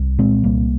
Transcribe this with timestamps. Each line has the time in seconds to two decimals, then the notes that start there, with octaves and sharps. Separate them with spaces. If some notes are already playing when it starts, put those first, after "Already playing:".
Already playing: C2
0.19 A#2 G#3 C4
0.44 C2 G3 A#3